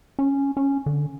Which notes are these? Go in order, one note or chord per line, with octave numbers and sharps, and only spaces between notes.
C#4
C#4
D3